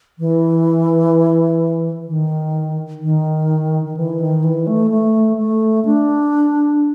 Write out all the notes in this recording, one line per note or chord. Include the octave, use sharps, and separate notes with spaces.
E3
D#3
D#3
D#3
E3
D#3
E3
A3
A3
A3
D4